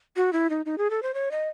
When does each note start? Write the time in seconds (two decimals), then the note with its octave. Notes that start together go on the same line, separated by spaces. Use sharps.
0.16 F#4
0.33 E4
0.50 D#4
0.65 D#4
0.78 G#4
0.90 A4
1.02 C5
1.14 C#5
1.31 D#5